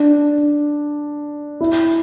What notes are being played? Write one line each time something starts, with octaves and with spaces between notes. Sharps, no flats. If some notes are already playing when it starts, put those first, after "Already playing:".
Already playing: D4
E4